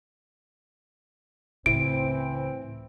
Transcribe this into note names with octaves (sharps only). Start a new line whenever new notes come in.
C#2 A2 C#3 E3 C4 E4 D7